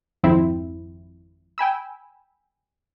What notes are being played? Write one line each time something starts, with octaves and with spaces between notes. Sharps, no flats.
G#1 F2 C4 E4
G5 G#5 B5 E6